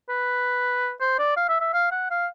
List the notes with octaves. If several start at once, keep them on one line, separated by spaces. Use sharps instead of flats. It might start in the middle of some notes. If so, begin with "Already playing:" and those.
B4
C5
D5
F5
E5
E5
F5
F#5
F5